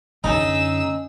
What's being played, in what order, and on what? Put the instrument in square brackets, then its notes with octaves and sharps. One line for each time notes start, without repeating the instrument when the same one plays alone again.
[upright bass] F#2 D3 [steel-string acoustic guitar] C#4 D#5 A5 [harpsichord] D#4 [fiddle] G#4 E6